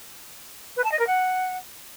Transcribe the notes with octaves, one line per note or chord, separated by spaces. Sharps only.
B4
A5
D#5
A#4
F#5